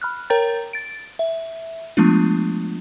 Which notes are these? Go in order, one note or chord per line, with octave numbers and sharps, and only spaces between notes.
B5 F6 F#6
A#4 C#5 G5 A#5 G6 A6
A6 D7
E5
F3 G#3 A3 B3 D4 F4